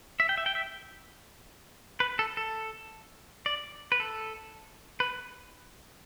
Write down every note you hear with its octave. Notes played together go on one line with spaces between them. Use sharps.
E5
G5
E5
G5
E5
B4
A4
A4
D5
B4
A4
B4